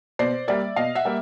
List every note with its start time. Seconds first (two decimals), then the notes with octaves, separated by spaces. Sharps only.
0.19 B2 C5 D5
0.48 G3 A#3 D5 E5
0.76 B2 D#5 F5
0.95 E5 F#5
1.05 G3 A#3